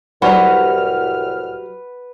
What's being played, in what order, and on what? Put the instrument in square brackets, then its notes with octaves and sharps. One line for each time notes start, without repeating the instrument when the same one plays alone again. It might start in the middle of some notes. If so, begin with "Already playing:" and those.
[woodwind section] C2 A2 F6 [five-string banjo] F#3 G3 A#5 [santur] B4 [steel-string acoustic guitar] F#5